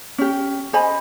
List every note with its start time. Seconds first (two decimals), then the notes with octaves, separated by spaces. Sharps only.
0.18 C#4 G4
0.73 C5 D#5 G#5 B5